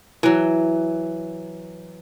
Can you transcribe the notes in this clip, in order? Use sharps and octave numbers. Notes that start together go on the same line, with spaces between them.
E3 F#3